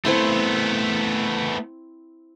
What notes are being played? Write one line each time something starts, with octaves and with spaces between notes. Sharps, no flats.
A3 B3 C4 E4 C6